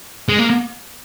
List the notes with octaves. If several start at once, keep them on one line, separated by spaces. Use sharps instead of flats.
G#3
A#3